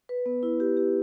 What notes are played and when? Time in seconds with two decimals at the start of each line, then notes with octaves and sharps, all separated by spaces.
0.09 B4
0.26 B3
0.43 E4
0.60 G4
0.77 G4